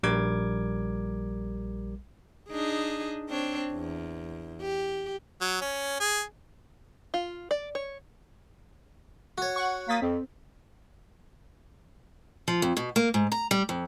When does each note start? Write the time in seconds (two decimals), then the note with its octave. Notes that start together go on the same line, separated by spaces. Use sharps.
0.03 A#1 G3 A#4 D6 G#6
2.49 D4 D#4 G#4
3.29 C4 D4 C#5
3.72 E2
4.61 G4
5.41 F#3
5.61 C#4
6.00 G#4
7.14 F4
7.51 D5
7.75 C#5
9.38 F#4 C#5
9.56 F#5 C#6
9.89 A#3 D#6 A6 B6
10.02 F2 C4
12.48 F3
12.62 F2
12.77 B2
12.96 A#3
13.14 G#2
13.32 A#5
13.51 G3
13.69 F2